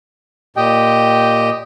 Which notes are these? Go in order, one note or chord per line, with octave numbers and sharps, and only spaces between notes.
A#2 G4 D#5 G5